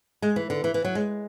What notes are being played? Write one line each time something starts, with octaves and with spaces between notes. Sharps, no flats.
G#3
E3
D3
E3
E3
F#3
G#3